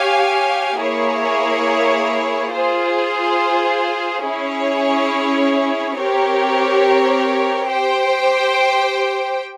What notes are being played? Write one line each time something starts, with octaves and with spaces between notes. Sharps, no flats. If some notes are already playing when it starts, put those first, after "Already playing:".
Already playing: G4 C#5 F5 G#5
A#3 E4 G#4 C#5
F4 G#4 C5
C#4 E4 G#4 C#5
C4 G4 A#4 C#5
G4 C5 G5